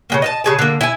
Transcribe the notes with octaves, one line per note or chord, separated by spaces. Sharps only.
C#3 G#3 A#3
D#5 F5 A5
C#3 F#4 G#4 A5
D3 A#3
E4 G#5